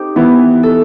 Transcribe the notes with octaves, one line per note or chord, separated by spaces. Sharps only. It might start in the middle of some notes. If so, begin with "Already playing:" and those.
Already playing: C4 D#4 G4
E3 B3 E4
A4